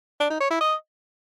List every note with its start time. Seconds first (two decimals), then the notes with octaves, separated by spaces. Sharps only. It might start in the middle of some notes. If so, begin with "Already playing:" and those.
0.20 D4
0.30 D#4
0.40 C#5
0.51 E4
0.61 D#5